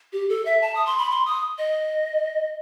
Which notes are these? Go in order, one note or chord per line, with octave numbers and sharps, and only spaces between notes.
G4
A4
E5
A5
D#6
C6
B5
C6
D#6
D#5